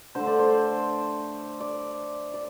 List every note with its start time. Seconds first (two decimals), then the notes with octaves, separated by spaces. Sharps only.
0.15 D3 A3 C5
0.27 D5
0.39 C5
1.60 D5
2.34 D5